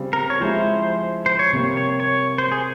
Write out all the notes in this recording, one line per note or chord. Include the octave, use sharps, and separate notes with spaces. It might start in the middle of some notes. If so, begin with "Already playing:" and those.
Already playing: C#3 G3 C4
A#4
C#5
F3 G#3 E4 C5
C5
C#5
C3 G3 A#3 C#5
C#5
C#5
C5
G#4